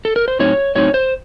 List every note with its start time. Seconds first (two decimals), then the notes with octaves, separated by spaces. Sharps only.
0.05 A4
0.16 A#4
0.28 C5
0.39 A2 F#3 C4 D#4 C#5
0.75 A2 F#3 C4 D#4 C#5
0.94 C5